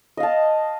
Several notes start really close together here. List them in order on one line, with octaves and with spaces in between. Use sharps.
D#5 F5 A5